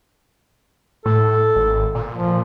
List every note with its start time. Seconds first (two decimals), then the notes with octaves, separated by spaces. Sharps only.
1.06 A2 A4
1.56 G#1
1.95 A#2
2.15 F3